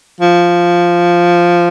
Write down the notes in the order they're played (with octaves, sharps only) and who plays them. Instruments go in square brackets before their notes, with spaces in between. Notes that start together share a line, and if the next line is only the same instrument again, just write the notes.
[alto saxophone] F3